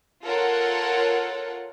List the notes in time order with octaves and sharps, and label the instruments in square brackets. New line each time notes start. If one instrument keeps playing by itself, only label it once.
[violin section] F4 A4 A#4 C#5 F#5